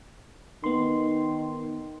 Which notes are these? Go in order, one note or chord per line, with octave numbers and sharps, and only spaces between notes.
D#3 B3 C6